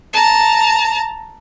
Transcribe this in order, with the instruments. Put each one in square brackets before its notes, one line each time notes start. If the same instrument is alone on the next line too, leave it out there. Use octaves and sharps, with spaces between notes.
[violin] A5 A#5